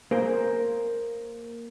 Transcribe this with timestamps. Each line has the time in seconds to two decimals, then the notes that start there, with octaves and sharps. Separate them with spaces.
0.11 A#3 G#4 A#4 C5